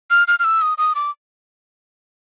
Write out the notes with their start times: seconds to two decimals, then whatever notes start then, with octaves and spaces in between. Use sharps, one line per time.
0.10 F6
0.28 F6
0.39 F6
0.44 E6
0.62 D#6
0.78 D#6
0.95 D6